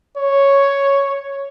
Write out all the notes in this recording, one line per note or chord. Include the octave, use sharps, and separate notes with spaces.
C#5